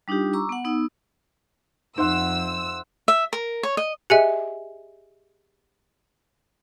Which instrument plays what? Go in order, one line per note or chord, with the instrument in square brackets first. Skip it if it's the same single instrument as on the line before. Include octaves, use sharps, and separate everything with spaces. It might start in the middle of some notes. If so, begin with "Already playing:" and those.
[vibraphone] G3 D4 D#4 F4 G4
A#5 C#6 D6 E6
B3 F#5
B3 D#4 E6
[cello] F2 [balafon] D#4 [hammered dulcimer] C5 E5 F#5 [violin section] E6
[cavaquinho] E5
A#4
C#5
D#5
[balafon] G4 G#4 D#5 [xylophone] E5 G#5 C#7